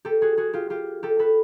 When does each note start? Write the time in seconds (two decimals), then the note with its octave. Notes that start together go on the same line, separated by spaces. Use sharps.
0.05 G4 A4
0.22 F#4 G#4
0.37 F#4 G#4
0.53 F4 G4
0.70 F4 G4
1.03 G4 A4
1.19 A4 B4